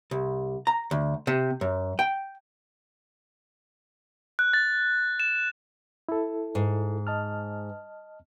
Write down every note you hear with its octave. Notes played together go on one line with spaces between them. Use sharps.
C2
A#5
D2
C3
F#2
G5
F#6
A6
E7
E4 A4
G#2
D#5 A5 F6